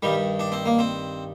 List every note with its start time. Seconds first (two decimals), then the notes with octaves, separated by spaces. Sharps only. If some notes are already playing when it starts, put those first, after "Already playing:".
0.03 G2 D#3 G3
0.40 D4
0.52 C4
0.66 A#3
0.79 C4